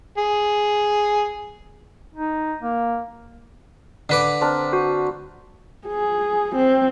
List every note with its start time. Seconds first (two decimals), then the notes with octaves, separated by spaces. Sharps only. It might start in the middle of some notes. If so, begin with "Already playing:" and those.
0.18 G#4
2.15 D#4
2.62 A#3
4.09 D3 B4 D6
4.41 C4 D4 A#4
4.73 F#4
5.86 G#4
6.55 C4